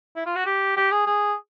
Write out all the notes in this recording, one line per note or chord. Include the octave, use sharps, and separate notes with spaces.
E4
F4
F#4
G4
G4
G#4
G#4